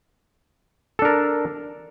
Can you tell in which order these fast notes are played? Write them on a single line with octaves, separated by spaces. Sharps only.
A4 D4 A#4